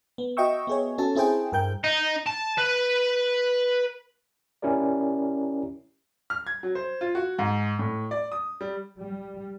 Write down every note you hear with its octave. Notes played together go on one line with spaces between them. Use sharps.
B3
F#4 D#5 E5 G5 C#6 E6
B3 G#4 C#5
C#4 F#4 A4 A5
C4 E4 G#4 C5 G5
G2 A#4 G5 G6
D#4
A5
B4
C#4 E4 G4 A#4 D5
F6
G#6
F#3
C5
F4
F#4
G#2
A2
D5
D#6
G3
G3